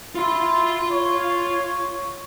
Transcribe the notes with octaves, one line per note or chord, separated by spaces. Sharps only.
E4 F4 C6
C#5